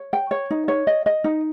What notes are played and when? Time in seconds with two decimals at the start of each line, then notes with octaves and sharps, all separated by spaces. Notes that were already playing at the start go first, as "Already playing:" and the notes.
Already playing: C#5
0.13 G5
0.31 C#5
0.51 D#4
0.68 C#5
0.87 D#5
1.06 D#5
1.24 D#4